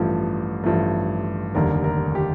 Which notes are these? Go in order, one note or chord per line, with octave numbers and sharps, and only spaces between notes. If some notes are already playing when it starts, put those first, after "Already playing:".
Already playing: A1 G2 F3 A3
A1 G2 F3 A3
F1 D#2 D3 G3 A#4
A#4
G4